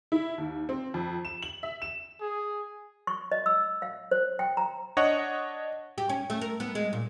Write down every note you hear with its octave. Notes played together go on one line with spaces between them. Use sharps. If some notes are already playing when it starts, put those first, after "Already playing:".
E4
D#2
C4
F2
E7
F#7
E5
E7
G#4
C#6
D#5
E6
F5
C5
G5
A#5
D4 C#5 D#5 F#5
G4
C#4
A3
A#4
B3
G#3
A#2